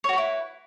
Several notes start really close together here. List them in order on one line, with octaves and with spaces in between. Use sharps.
C#5 F#4 B4 E4